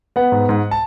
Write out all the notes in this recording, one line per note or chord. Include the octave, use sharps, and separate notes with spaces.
B3 F#5
G#2
G#2
A5